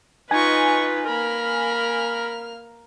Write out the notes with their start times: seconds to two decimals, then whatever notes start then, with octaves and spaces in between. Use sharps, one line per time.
0.31 D#4 F4 B4 D#5 G#5 C#6
1.08 A#3 A#4 B5 F6